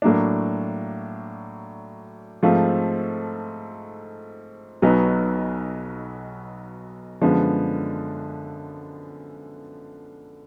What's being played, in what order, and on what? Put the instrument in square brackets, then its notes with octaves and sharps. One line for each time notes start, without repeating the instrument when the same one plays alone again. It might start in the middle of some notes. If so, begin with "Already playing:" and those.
[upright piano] A2 F#3 A#3 D4
G#2 F3 A3 C4 F4
B1 B2 F#3 B3 D#4
F#2 D3 F3 G#3 B3